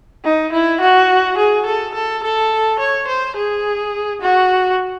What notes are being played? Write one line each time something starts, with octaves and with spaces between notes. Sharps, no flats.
D#4
E4
F#4
G#4
A4
A4
A4
C#5
C5
G#4
F#4